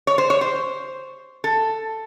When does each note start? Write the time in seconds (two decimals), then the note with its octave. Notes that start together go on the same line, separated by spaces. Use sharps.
0.07 C#5
0.18 C5
0.30 C#5
0.41 C5
1.44 A4